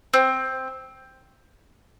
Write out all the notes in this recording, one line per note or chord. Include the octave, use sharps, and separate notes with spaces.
C4